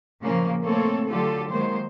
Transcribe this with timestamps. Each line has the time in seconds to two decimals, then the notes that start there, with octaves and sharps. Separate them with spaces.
0.23 A#2 C#3 F3 A#3
0.62 A3 A#3 C4 A4 C#5
1.09 D3 F#3 A3 F4 G4 A4
1.51 D#3 F#3 G#3 A#3 C5